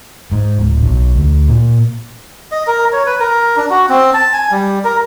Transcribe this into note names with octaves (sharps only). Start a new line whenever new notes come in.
G#2
D1
B1
D2
A#2
D#5
A#4
C#5
B4
A#4
D4
F#4
C4
A5
G#5
G3
A#4